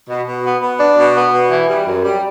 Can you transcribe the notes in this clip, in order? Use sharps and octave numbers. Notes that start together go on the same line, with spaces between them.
B2
B2
B3
B3
D4
B2
B3
B2
E3
G3
F#2
G3